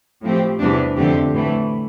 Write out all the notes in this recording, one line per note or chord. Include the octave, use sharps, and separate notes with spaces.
A2 F3 C4 G4
E2 C3 E3 G3 D4
F2 D3 A3 C4 G4
A2 E3 A3